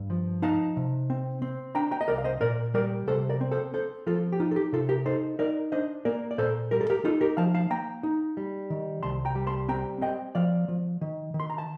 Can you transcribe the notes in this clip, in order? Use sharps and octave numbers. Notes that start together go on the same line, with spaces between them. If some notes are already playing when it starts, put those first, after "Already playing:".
Already playing: G2
F3
D#4 F5 A5
C3
C4
C4
D4 G5 A#5
G5 A#5
D#5
C2 A#4 D5
F5
C5 D#5
A#2 A#4 D5
G3 A#4 D5
C3 A4 C5
A#4 D5
C4
A4 C5
C4 A4 C5
F3 F4 A4
G4
D#4 F4
A4
G4
C3 F4 A4
G4 A#4
D#4 A4 C5
D#4 A#4 D5
D4 C5 D#5
A#3 A#4 D5
D5
A#2 A4 C5
G3 A#4
A4
G4 A#4
D#4 F4 A4
G4 A#4
F3 F5 A5
F5 A5
A#3 G5 A#5
D#4
G3
D#3
C2 A5 C6
G5 A#5
G3
A5 C6
C4 G5 A#5
C4 D#5 G5
F3 D5 F5
F3
D#3
D#3
C6
A#5
A5